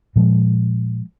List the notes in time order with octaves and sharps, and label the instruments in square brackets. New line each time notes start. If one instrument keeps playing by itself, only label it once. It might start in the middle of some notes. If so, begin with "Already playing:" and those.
[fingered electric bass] A#2 F3 G#3